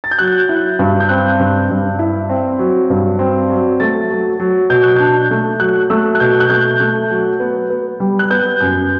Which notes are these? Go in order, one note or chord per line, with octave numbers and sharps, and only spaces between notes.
A6
G6
F#3 F#6
E4
G2
G6
C4 F#6
G2
G2
E4
C4
F#3
G2
C4
F#3
A3 A6
F#3
F#3
B2 G6
F#6
D4 G6
A3
F#3 F#6
A3 E6
F#6
B2 G6
F#6
A3 G6
A3
F#3
B3
B3
G3
F#6
B3 G6
F#2 G6